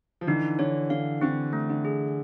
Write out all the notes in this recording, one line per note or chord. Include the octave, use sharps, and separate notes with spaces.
F3
D3 E3 D#4
D3 C#5
D3 F5
D3 C4
A3
D3
G#4